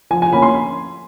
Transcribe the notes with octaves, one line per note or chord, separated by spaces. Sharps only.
F3 G#5
G#5
A#3 C#4 B5
C6